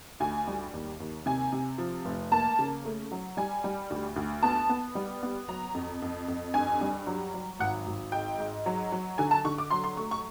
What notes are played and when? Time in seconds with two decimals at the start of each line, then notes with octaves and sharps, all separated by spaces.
0.20 D2 G#5
0.47 G3
0.73 D#2
1.00 D#2
1.26 C3 G#5
1.53 C3
1.78 F3
2.05 F1
2.32 A#3 A5
2.59 C#3
2.85 A3
3.12 F#3
3.37 G3 G#5
3.64 G3
3.90 D2
4.16 D2
4.43 B3 A5
4.69 B3
4.95 G3
5.23 B3
5.48 F#3 A#5
5.75 F2
6.02 F2
6.28 F2
6.54 G2 G#5
6.81 G3
7.07 F#3
7.34 F#3
7.59 G#1 F#5
7.86 G#1
8.12 G#2 G5
8.38 G#2
8.66 F#3
8.92 F#3
9.18 D3 G#5
9.31 A5
9.45 D3 C#6
9.58 D6
9.71 F#3 C6
9.84 C6
9.97 A3 C#6
10.11 C#6